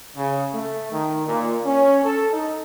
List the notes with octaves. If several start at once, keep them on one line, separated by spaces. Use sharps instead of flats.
C#3
A3
D#3
A#2
C#4
A4
D#4